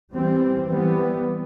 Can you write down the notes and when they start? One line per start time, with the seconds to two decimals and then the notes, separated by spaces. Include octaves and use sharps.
0.12 E3 G3 C4
0.70 E3 G3 B3